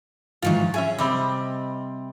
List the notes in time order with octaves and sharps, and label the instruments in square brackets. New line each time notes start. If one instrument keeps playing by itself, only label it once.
[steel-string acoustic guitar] G#2 E3 F#3 [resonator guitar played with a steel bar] D#3 F4
[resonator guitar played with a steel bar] C#4 E5 G#5 [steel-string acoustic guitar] G#4
[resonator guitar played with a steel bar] C3 G3 C4 [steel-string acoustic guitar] D#5